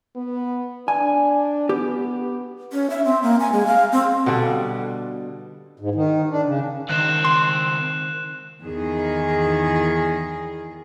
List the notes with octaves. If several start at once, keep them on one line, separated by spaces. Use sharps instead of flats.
B3
D4 G#5
B3 G4
C#4
E5
C4
A#3
G#5
G#3
F5
C4
B2 D3 G3 D4
G#2
D#3
D4
C#3
C#2 D#3 C4 F#6 E7
C6
E2 D#3 G#4